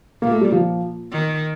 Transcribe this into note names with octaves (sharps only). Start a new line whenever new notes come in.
A#2 A#3
A3
G3
F3
D#3